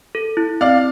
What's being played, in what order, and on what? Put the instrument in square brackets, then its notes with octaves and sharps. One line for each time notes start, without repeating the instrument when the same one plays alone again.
[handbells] A4
E4
[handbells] C4 [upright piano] D5 F5